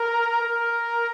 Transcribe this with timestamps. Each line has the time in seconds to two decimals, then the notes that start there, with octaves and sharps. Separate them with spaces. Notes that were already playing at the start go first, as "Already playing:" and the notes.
Already playing: A#4
0.41 A#4